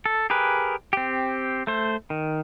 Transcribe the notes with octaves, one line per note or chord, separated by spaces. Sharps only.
A4
G4 G#4 A#4 B4
C4 G4
A3 C5
D#3